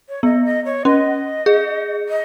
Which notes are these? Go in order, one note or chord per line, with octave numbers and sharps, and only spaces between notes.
C#5
B3 D#5
D#5
C#5
C#4 D#5
G#4
D#5